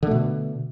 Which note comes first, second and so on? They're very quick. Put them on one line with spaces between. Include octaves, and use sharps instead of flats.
D3 A3 B2